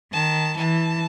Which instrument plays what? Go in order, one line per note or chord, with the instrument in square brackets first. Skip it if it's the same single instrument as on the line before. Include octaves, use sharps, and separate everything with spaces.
[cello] D#3 [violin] A5
[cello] E3 [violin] A5